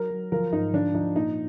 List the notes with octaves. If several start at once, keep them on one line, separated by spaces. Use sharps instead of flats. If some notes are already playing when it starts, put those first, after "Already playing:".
Already playing: F#3 A#4
F#3
F3 A#4
G#2 D#4
F3 D4
F3 D#4
A#2 D#4